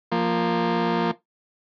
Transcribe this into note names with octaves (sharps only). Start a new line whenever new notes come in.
F3 A#3